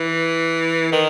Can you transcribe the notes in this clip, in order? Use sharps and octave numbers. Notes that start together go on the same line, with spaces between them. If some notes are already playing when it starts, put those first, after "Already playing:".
Already playing: E3
D#3